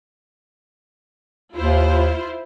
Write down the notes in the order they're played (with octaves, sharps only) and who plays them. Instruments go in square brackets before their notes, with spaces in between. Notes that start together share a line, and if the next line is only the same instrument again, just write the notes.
[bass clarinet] D#2 [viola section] E4 F4 C5